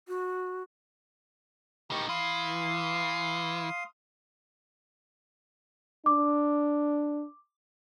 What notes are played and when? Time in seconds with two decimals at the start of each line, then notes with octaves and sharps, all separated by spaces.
0.08 F#4
1.91 A2 D#4 G4 A#4 C#6
2.09 E3 F5 C6 D#6
6.06 D4 D6